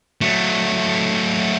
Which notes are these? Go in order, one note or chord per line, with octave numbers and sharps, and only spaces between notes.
F#3 A3